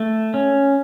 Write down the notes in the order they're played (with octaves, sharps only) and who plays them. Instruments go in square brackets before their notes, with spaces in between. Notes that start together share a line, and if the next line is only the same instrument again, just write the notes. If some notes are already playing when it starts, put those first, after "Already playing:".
Already playing: [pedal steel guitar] A3
C#4